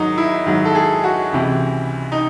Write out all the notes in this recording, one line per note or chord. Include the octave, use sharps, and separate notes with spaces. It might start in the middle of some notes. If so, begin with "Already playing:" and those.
Already playing: G#2 D#3 F#3 D#4
E4
G#2 D#3 F#3
A4
G#4
F#4
C#2 C3 E3
D#4